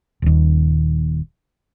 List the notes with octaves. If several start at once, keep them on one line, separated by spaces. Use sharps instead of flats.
D#1 D#2